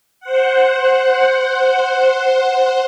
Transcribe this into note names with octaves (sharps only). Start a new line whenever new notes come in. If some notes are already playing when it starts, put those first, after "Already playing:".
C5 F#5